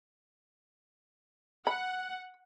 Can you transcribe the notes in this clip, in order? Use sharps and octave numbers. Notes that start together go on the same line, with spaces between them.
F#5 B5